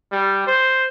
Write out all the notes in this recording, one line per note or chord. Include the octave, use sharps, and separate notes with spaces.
G3
C5